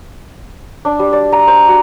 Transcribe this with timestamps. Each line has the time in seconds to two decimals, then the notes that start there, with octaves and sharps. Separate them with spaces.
0.85 D4
0.99 G3
1.13 D5
1.32 A#5
1.48 C5
1.68 F#4